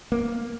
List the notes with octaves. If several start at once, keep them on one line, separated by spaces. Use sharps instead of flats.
A#3